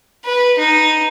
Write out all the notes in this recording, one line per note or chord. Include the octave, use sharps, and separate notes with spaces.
B4
D#4